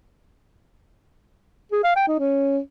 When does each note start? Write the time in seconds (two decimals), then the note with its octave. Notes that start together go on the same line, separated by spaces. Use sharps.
1.72 G#4
1.84 F5
1.96 G5
2.08 D#4
2.20 C#4